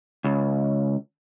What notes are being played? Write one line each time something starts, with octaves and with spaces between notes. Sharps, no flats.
C#2